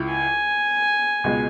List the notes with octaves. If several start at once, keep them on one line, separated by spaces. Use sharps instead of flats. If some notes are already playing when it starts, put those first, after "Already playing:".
Already playing: C#2 E4
G#5
C#2 B2 G#3